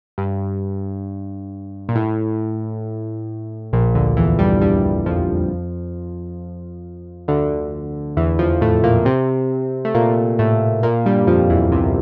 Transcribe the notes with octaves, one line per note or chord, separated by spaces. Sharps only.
G2
A#2
A2
A#1 A#2
D2 D3
E2 E3
G2 G3
G2 G3
F2 F3
D2 D3
E2 E3
F2 F3
A2 A3
A#2 A#3
C3 C4
A3
A#2 A#3
A2 A3
A#2 A#3
G2 G3
F2 F3
E2 E3
C2 C3